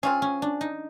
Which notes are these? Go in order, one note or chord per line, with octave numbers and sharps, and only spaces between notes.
C4 C#4 F4 G#4
C#4
D4
D#4